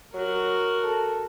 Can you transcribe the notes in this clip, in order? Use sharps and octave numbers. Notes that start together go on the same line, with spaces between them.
F#3 F#4 A#4
A4